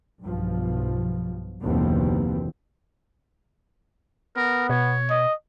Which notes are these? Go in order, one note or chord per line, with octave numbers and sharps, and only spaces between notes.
B1 G2 B2 F3
F#1 D#2 B2 D3 E3 C4
B3 A#4
B2 C#5
D#5